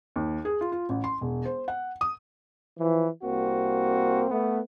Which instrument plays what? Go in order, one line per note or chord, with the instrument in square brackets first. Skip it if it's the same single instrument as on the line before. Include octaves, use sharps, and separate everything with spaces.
[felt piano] D#2
G#4
F4
F4
A1
C6
E1
C5
F#5
D#6
[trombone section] E3 F3
C2 A#3 C4 F#4
A3 B3